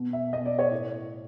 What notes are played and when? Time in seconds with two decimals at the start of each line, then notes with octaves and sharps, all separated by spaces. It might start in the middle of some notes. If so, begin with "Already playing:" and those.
Already playing: B2
0.13 E5
0.33 B2 D#5
0.46 D5
0.59 C#5
0.71 A2